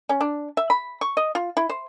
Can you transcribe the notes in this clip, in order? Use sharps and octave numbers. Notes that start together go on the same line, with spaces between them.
C#4
D4
E5
B5
C#6
D#5
F4
E4
C5